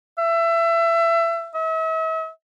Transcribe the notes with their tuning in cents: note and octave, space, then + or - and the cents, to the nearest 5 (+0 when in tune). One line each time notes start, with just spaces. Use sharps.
E5 +25
E5 -40